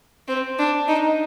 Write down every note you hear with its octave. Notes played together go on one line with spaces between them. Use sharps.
C4
D4
D#4